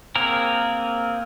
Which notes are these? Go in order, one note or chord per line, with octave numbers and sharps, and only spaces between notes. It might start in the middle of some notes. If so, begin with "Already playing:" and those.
A#3 C4 G#4 A#4